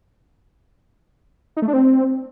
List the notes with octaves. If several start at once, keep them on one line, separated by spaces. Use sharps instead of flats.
D#4
A3
D4
C4